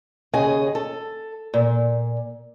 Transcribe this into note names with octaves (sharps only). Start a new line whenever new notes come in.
D#2 C#3 G#4 D#5 G#5
A4
A#2